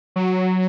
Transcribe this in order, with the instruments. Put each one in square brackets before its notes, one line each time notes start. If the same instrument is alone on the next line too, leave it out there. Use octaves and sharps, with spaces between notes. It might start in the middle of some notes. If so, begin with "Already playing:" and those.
[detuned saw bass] F#3